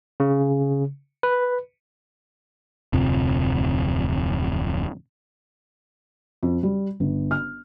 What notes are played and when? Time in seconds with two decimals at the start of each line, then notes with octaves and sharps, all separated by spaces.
0.20 C#3
1.23 B4
2.93 D1 F2 C3 F3
6.43 F2
6.63 G3
7.00 G1
7.31 F6